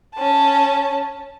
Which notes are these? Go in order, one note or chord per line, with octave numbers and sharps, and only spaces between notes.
C#4 A5